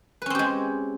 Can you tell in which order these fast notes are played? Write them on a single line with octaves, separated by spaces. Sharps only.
B4 C#4 C4 G4 G#3